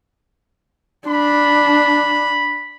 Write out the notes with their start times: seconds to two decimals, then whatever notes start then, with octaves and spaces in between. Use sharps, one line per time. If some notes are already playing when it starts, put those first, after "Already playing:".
1.08 D4 B5